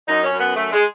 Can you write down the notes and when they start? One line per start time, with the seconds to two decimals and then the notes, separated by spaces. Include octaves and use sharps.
0.08 F#2 D#4
0.24 C#4
0.32 F#2
0.40 B3
0.56 F#2 A3
0.72 G#3